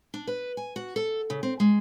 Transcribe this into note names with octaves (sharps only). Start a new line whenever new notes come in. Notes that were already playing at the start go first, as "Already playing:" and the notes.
D4
B4
G#5
F#4
A4
C#3
C4
G#3